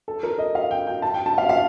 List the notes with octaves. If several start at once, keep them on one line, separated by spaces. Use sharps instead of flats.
A4
A#4
D#5
F5
G5
G5
A5
G5
A5
F5
F5